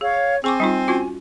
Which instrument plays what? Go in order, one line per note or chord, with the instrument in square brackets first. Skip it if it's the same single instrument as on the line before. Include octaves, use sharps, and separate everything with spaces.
[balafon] G#4 [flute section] C#5 F5
[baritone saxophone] C4 [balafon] G#4 C#6 D6 [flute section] G#5
[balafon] G3 D#4 F4
C#4 F4 F#4